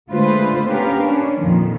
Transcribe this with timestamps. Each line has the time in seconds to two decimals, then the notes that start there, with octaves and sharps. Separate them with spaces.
0.11 D3 G#3 A3 F4 B4 C5
0.69 B3 C#4 G4 A#4 B4 F5
1.00 C#4 D4
1.42 F2 A#2 D#3 F3